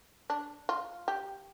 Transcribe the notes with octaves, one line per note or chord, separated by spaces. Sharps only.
D4
F4
G4